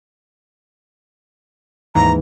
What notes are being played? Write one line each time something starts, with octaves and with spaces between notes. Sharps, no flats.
D#2 G#2 E3 A#5